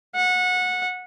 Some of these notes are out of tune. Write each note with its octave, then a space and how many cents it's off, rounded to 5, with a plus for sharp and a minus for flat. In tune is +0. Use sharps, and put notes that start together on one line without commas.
F#5 -20